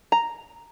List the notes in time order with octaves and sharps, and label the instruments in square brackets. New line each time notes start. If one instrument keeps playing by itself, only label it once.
[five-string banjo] A#5